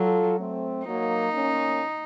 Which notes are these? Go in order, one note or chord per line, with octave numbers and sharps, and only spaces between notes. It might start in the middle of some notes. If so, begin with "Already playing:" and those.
Already playing: F#3 F4 A4
A3 C4
F#3 A#3 D#4
A#3 C#4